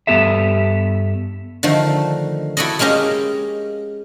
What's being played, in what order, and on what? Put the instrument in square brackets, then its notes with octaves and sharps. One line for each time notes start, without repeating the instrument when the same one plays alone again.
[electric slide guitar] G2 B3 G4 A4 E5
[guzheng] D3 D#3 F3 A3
E4 F#4 A4 D5 D#5
G#3 A#3 C#4 G4 D#5